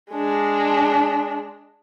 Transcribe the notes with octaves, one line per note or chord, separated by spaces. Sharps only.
G#3 D4